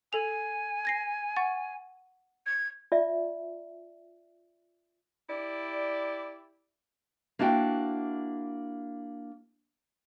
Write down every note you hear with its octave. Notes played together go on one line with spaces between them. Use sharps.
A4 G#5 F7
G#6 A#6 C7
F#5 C#6 A6
G#6
F4 D5 E5
E4 G4 D5
A#3 D4 E4 F#4 G5